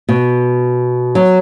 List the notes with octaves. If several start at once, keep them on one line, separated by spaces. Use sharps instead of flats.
B2
F#3